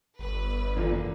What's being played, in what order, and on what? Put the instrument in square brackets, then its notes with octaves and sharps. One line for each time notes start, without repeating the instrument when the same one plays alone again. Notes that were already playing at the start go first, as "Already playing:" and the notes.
[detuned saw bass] G1 [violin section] B4
[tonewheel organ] F#2 E3 A#5 [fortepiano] A#2 D3